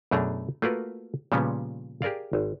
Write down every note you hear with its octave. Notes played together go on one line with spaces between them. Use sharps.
F#2 B2 A3 D4 G#4 A#5
A3 A#3 F4 F#4 A#4 B4
A#2 C#3 F3 G3 B3 C#4
G4 G#4 A#4 D5 F5
G#1